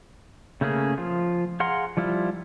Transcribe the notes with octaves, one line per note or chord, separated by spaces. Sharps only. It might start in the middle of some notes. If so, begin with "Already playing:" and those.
C#3 A3 A#3 C#4 G#4
F3 F4
G#4 F5 F#5 A#5 C6
F3 G3 E4 F4